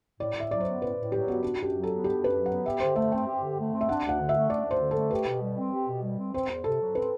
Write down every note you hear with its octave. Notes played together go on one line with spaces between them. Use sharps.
A2 D5
A2 E5
F#3 D5
C5
B3
A2 B4
A2
F#3 G4
B3 F#4
D4 F#4
F#2 G4
F#3
A4
B3
D4 G4
F#2
B4
F#3
B3 F#5
G4 E5
D3 C5
A3 E5
C4 G5
G4
D3
A3
C4
E5
D4 F#5
D2
F#5
D3
E5
A3
D4 D5
D2
C5
D3
A3 A4
G4 B4
B2
G3
C4
G4
B2
G3
C4
C4 C5
E2
C3 A4
F#3
C4 B4